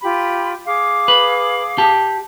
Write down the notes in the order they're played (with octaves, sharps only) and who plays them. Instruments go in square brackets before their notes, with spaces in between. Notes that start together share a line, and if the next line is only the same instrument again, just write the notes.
[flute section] F4 G4 B5
G#4 F5 D6
[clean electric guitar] B4
G4 A5